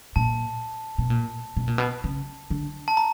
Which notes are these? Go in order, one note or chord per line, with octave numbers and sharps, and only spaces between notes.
A#2 A5
B2
A#2
B2
A#2
B2
C#3
D3
A5
A#5